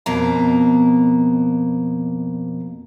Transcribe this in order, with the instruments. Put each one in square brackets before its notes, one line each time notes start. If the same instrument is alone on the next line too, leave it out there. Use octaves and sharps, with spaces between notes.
[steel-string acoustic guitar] F2 B2 A#3 A#5